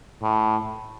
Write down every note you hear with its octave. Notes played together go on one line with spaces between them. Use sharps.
A2